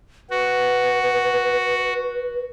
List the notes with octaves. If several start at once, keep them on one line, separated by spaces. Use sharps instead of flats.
F#4 B4